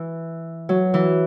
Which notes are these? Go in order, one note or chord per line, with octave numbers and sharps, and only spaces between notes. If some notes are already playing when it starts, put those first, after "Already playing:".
Already playing: E3
F#3
E3